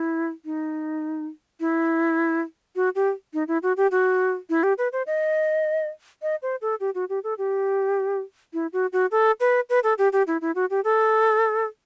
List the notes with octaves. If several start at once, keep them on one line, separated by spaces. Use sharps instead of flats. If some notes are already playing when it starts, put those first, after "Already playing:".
Already playing: E4
D#4
E4
F#4
G4
D#4
E4
F#4
G4
F#4
E4
G4
B4
C5
D#5
D#5
C5
A4
G4
F#4
G4
A4
G4
E4
F#4
F#4
A4
B4
B4
A4
G4
G4
E4
E4
F#4
G4
A4